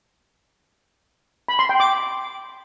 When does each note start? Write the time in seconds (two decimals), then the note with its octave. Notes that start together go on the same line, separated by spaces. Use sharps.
1.48 B5
1.59 C6
1.69 G5
1.80 D6